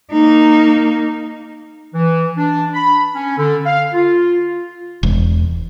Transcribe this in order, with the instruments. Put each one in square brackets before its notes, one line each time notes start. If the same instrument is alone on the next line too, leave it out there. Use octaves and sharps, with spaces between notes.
[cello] A#3 D#4
[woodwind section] E3
D4
B5
C#4
D3
F5
F4
[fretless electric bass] E1